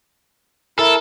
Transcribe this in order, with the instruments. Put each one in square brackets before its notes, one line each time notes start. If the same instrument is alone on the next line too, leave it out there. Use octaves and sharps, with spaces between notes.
[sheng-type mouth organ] E4 A#4 [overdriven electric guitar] A4